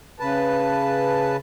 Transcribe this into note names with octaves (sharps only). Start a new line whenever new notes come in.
C#3 B4 A5